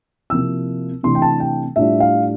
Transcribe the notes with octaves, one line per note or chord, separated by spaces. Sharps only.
C3 F3 A#3 E4 E6
C3 E3 A3 D4 C6
G5
A5
G5
A2 G3 D4 F4 E5
F5